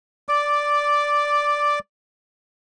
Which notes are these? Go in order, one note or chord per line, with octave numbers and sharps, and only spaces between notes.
D5 D6